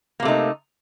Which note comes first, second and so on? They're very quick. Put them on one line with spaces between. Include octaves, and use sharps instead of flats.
A#3 C3 A3 D#4